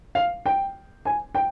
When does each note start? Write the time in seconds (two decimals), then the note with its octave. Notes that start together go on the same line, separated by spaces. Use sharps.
0.15 F5
0.46 G5
1.05 G#5
1.35 G5